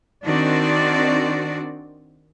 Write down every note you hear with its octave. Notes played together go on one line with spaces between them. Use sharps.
D#3 C4 D4 F#4 D5